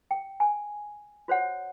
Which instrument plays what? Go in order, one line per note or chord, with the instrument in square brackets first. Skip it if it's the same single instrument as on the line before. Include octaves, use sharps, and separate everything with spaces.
[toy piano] G5
G#5
F#4 C5 C#5 F#5